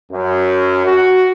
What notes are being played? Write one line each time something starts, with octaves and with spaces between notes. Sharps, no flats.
F#2
F#4